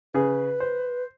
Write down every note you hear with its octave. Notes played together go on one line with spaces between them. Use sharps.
C#3 G#4 B4
C5